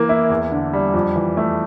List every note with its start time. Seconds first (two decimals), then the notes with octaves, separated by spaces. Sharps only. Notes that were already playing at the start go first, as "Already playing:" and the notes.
Already playing: E3 A#3
0.09 E4
0.30 E2
0.51 D3
0.73 G3
0.94 F2
1.16 E3
1.37 A3